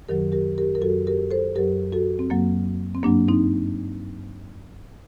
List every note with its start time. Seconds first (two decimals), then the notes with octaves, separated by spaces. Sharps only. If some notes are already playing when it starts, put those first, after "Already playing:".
0.08 F#2 D#3 F#3 G4 A#4
0.32 G4 A#4
0.58 G4 A#4
0.75 A#4
0.81 F#2 F#3 F#4 A4
1.07 G4 A#4
1.31 A4 C5
1.55 F#2 F#3 G4 A#4
1.92 F#4 A4
2.19 C4
2.30 F#2 F#3 A#3
2.95 C4
3.03 G2 F#3 A#3 D4
3.28 C4 D#4